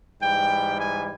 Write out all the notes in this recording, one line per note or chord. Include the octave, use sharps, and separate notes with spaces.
G#2 E3 G3 G5
G#5